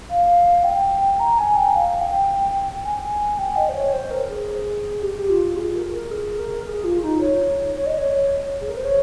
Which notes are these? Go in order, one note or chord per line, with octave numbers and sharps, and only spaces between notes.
F5
G5
A#5
G#5
G5
F5
G5
G#5
G5
D#5
C5
C#5
C5
A#4
G#4
G4
F4
G#4
A#4
A#4
G#4
A#4
G#4
F4
D#4
C#5
C#5
D#5
C#5
G#4
A#4
C5
C#5